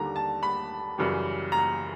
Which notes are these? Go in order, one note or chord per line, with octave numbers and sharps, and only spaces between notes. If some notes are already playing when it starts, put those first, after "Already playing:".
Already playing: D#2 D3 G3 A#5
A5
B5
F#2 C#3 E3 G3
A#5